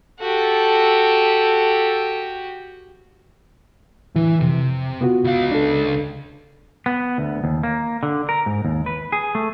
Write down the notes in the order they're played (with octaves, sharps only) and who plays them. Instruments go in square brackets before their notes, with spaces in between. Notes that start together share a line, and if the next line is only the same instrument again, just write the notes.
[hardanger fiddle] F#4 G4 [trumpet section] A4
[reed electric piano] A2 D3 E4 [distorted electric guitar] E3
[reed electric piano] F2 [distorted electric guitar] C3
[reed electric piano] B3 F4 F#4
[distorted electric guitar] C#2 F5
[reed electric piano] D4 A4
[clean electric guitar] B3
D2
D#2
A#3
D3
A#4
G#2
D#2
B4
G#4
A3